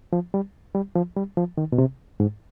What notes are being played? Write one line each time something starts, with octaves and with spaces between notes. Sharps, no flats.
F3
G3
G3
F3
G3
F3
D#3
B2
C3
G#2